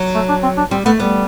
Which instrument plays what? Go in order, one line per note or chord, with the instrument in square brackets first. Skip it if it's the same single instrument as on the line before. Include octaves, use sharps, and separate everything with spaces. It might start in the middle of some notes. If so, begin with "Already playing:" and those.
Already playing: [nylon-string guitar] F#3
[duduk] A3
D4
C4
D4
[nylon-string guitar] G3 [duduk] C4
[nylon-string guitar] A3 [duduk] B3
[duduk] G3 [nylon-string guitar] B3